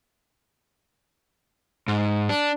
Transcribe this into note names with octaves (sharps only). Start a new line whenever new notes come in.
G#2
D4